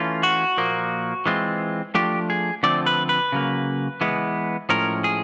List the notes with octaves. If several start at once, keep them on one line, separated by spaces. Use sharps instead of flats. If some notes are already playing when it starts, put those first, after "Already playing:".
Already playing: E3 A3 C#4 F4
F#4
A#2 F3 A#3
E3 G#3 C4 F4
F3 A3 D4 F4 G4
G#4
D3 F3 A3 C4 D5
B4
B4
C#3 F#3 A#3
E3 G#3 B3
A2 F3 G#3 C#4 A#4
G#4